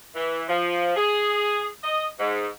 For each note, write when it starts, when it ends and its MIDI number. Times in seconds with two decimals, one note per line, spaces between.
0.16 0.44 52
0.48 0.93 53
0.96 1.67 68
1.84 2.07 75
2.19 2.47 44